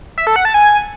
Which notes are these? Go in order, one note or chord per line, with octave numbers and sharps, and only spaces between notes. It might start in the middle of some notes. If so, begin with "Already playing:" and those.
E5
A4
F#5
A5
G#5